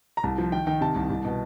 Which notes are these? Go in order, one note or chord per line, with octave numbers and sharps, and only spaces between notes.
A#5
C2 A5
F3
D#3 G5
D#3 G5
C3 A5
C2
C2
B2